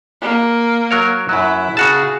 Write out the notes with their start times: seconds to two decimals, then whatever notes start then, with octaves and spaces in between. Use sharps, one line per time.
0.22 A#3
0.91 F#3 A#4 C#5
1.29 F#2 F#3 E4
1.77 C#3 F#4 G#4 A5